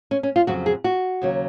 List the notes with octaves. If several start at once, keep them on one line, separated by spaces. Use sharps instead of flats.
C#4
C#4
F4
F2 C#3 F#3 F#4
G#4
F#4
D#2 C#3 F#3